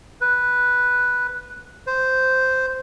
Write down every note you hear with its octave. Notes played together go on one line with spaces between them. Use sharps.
B4
C5